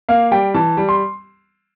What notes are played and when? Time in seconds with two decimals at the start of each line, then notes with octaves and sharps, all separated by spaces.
0.09 A#3 F5
0.31 G3 G5
0.54 E3 A5
0.77 G3
0.89 C6